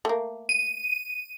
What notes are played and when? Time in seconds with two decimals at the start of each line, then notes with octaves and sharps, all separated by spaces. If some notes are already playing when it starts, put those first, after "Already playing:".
0.05 A3 A#3
0.49 D#7